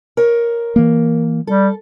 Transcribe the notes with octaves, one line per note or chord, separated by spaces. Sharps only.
A#4 C#5
E3 A#3
G3 A4